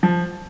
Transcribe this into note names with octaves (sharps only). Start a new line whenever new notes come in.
F3